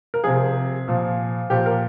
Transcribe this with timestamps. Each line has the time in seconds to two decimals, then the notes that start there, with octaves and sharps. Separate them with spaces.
0.14 A#4
0.24 C3 F3 G#4
0.88 A#2 F3
1.50 A#2 F3 G4
1.66 A#4